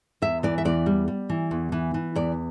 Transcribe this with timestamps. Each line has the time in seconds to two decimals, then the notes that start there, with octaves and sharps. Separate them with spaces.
0.22 E2 E5
0.43 E3 D5
0.58 E5
0.65 E2 D5
0.86 G3
1.08 G3
1.30 E3
1.51 E2
1.72 E3
1.94 E3
2.16 E2 D5